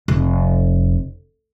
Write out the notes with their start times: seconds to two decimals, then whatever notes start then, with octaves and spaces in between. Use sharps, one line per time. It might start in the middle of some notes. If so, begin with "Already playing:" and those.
0.08 F1